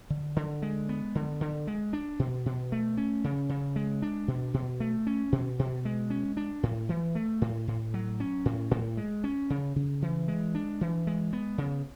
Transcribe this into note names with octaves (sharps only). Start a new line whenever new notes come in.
D3
D3
G#3
B3
D3
D3
G#3
D4
B2
B2
A3
C#4
C#3
C#3
G#3
D4
B2
B2
A3
C#4
B2
B2
G#3
C#4
D4
A2
E3
A3
A2
A2
F#3
C#4
A2
A2
G#3
C#4
C#3
C#3
E3
G#3
D4
E3
G#3
B3
C#3